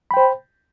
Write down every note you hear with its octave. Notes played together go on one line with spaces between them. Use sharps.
C5 G5 B5